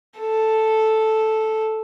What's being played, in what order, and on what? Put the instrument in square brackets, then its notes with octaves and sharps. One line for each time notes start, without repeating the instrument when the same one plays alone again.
[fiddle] A4